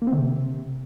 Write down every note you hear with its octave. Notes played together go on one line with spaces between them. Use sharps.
A#3
C4
D3
C3